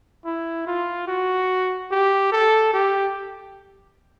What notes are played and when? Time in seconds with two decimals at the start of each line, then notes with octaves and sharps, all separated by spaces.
0.25 E4
0.67 F4
1.08 F#4
1.91 G4
2.32 A4
2.73 G4